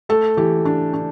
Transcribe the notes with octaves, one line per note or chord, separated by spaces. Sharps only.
A3 A4
E3 G4
D4
D4